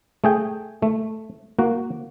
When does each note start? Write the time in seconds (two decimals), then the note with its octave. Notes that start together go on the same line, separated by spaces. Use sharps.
0.24 A3 G#4 G5
0.82 A3
1.59 A#3 F#4